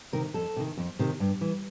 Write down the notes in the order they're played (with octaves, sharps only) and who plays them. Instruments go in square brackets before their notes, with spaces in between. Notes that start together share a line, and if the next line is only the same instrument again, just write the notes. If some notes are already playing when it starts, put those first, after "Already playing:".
[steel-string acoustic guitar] C3 D#3 A#4
F2 A4
C3 D#3
F2
C3 D#3
G2
E3